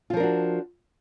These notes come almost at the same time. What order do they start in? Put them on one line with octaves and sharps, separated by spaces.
F4 F3 A#4 D4 F#4